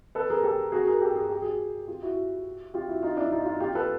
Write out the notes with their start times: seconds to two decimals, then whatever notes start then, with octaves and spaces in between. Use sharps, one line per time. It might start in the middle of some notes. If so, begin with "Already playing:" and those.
0.15 A4 B4
0.30 G#4 A#4
0.43 G4 A4
0.72 F#4 G#4
0.87 G#4 A#4
1.02 G4 A4
1.16 G#4
1.29 G4
1.42 F#4 G#4
1.87 F4 G4
2.02 E4 F#4
2.74 F4 G4
2.89 E4 F#4
3.03 D#4 F4
3.17 D4 E4
3.32 D#4 F4
3.46 D#4 F4
3.60 F4 G4
3.75 A4 B4